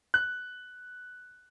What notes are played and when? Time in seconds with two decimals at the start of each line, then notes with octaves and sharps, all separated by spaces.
0.14 F#6